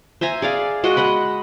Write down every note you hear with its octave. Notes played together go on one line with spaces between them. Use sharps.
C5 E5 G#5 A#5
G#4 D5 F5
G#3 F#4 D#5
D#5 F#5 B5